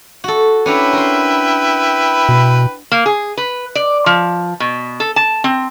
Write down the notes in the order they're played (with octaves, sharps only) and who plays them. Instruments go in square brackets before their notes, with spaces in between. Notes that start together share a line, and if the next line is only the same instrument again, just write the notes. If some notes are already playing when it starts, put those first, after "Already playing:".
[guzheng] F#4 A4
[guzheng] C#4 D4 A#5 [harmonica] E4 B4 G5
[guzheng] A#4 C6
[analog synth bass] B2
[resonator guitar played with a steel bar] A#3
G#4
B4
D5
F3
B2
A4
A5
C4